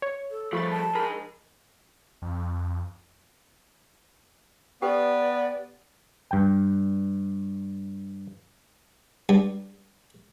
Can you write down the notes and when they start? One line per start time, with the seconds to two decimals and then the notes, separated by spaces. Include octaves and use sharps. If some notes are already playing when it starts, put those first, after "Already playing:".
0.02 C#5
0.31 A4
0.53 F3 G3 A3 B5 C#6 A6
0.71 A5
0.95 D#4 G#4 A#4 B5
2.22 F2
4.82 B3 G4 A4 B4 D5 G5
6.31 G2 G5
9.29 G2